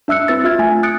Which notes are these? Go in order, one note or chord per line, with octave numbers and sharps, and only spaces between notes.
D4 E5 E6 F#6 C#7
C4 E4 B4 E6 A6
D4 F4 E5 F6 G#6
A3 G#5
D#6 F#6 A6 C#7 D7